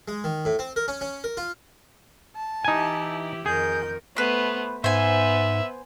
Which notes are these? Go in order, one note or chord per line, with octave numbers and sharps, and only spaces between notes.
G#3
D#3
A2
C4
A#4
C#4
C#4
A#4
F4
A5
E3 D#4 E4 G4 G#5
F2 D#3 G#4 A#4 G6
A3 B3 B4 C5
G#2 B3 C5 E5 G#5